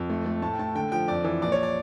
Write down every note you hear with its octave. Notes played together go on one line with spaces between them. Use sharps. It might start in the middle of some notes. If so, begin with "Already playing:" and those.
Already playing: F2
A3
A3
A2 A5
G5
A2 A5
D3 G5
F3 G5
F2 D5
E3
A#1 D5
C#5
D5